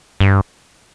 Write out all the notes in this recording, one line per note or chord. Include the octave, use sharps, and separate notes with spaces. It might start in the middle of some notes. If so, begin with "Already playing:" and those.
G2